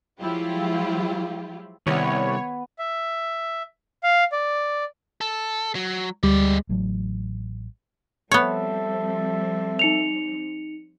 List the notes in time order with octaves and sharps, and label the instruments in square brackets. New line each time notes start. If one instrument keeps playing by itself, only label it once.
[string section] F3 F#3 G#3 E4 F4 G4
[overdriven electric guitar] C2 [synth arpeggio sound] D#3 [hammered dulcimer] B3 B4 [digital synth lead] C#5
[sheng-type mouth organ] E5
F5
D5
[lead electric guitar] A4
F#3
[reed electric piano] D2 G3 [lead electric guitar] G#3 D5
[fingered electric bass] A1 A2 F#3
[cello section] F3 G3 C4 [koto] B3 C#5 [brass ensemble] A4 E5
[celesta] D#4 C#7 F7